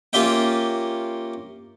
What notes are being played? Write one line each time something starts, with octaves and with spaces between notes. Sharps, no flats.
A#3 C#4 F4 G4 E5 G5